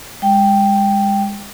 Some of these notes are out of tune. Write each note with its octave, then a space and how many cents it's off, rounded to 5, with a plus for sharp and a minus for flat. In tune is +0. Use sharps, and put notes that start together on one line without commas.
G#3 -30 G5 +0